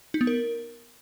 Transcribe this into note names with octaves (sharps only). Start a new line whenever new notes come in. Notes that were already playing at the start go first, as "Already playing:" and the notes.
D#4
B3
A#4